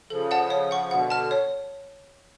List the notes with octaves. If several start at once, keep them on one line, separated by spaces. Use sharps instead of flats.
C#3 F3 A4
D5 F#5 A5
C#5
F#5 C#6
B2 D3 F#5
A5 F6
C#5